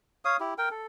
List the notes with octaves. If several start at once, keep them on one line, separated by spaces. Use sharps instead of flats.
C#5 F5 D#6
E4 G4
A#4 G5
A4